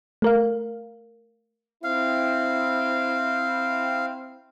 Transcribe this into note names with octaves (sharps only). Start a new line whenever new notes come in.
A3 A#4 F5
C4 E4 F5